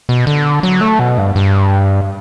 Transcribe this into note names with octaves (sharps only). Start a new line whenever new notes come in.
B2
D3
F#3
A3
B2
G2
G2